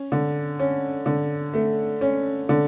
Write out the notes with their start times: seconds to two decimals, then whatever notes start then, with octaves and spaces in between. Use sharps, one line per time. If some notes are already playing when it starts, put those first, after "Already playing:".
Already playing: C#4
0.12 D3
0.59 C#4
1.06 D3
1.54 A3
2.01 C#4
2.49 D3